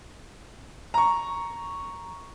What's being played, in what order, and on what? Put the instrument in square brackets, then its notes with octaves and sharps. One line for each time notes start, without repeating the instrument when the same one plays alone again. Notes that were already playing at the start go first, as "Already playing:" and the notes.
[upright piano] A#5 C#6